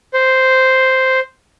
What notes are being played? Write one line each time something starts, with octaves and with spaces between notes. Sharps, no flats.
C5